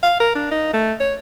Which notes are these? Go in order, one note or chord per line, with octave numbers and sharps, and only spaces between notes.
F5
A#4
D4
D#4
A3
C#5